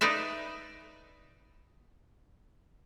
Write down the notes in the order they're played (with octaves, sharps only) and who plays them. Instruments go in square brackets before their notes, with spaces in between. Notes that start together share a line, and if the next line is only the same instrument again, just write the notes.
[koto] D#4 B4 D5 E5